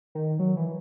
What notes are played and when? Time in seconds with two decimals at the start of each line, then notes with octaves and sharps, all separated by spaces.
0.15 D#3
0.39 F#3
0.56 E3